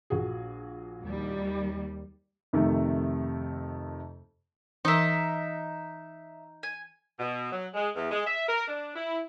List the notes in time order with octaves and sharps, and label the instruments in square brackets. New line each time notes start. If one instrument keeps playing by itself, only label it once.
[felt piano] A#1 F#4 G#4
[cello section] D#2 G3
[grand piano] F2 C3 D#3 A3
[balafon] E3 [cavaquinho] D#4 A#4 [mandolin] D#5 E5
[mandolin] G#5
[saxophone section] B2
F#3
G#3
E2
G#3
E5
A#4
D4
E4